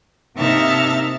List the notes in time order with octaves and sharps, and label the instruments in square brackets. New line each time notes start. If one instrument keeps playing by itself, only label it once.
[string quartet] C3 A#3 D#4 E5 A5 F6